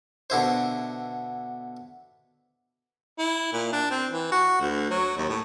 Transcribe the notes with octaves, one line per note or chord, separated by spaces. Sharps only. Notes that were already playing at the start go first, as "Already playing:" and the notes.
B2 D3 E4 C5
E4
A#2
D4
C4
E3
F#4
D2
F#3
D#2
A2